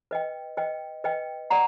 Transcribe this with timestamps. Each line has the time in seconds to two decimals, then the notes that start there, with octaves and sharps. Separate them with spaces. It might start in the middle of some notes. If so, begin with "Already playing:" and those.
0.11 B4 D#5 G5
0.57 B4 D#5 G5
1.04 B4 D#5 G5
1.50 D5 F#5 A#5